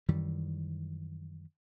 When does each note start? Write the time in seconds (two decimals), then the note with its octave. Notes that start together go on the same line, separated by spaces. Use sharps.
0.08 F#2 D#3 E3 G3